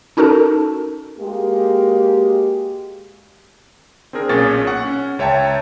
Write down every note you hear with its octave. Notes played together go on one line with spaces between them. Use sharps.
C#4 D#4 F#4 A4 A#4 A5
G#3 A#3 F#4 G4
C4 D4 G#4 A#4
B1 A#2 C#4 G#4 C#6 A6
F#5 C#6
C#4
C#2 C#5 E5 G5 A5 A#5